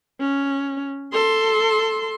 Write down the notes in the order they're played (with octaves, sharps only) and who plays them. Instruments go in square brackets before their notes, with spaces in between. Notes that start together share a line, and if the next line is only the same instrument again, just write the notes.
[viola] C#4
A4 C6